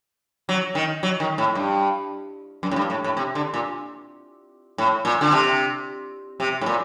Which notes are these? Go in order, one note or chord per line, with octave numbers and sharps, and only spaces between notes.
F#3
D#3
F#3
D#3
A2
G2
F#2
A2
G2
A2
A2
C3
D3
A#2
A2
A#2
D3
C3
C3
A2
A#2